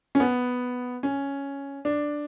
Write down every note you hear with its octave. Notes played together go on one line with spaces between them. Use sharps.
C#4
B3
C#4
D4